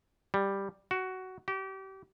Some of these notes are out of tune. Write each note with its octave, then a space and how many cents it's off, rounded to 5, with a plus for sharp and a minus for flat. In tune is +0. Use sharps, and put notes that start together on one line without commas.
G3 +5
F#4 +10
G4 -30